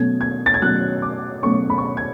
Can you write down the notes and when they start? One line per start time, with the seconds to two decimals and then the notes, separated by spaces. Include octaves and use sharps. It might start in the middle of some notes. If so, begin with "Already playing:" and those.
Already playing: B2 F#3 A3 C#4 G#6
0.21 G#6
0.46 A6
0.54 G#6
0.61 B2 F#3 A3 C#4 F#6
1.02 D6
1.43 B2 F#3 A3 C#4 C#6
1.70 B5
1.78 C#6
1.85 B5
1.97 G#6